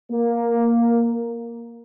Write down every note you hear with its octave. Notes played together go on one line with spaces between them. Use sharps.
A#3 A#4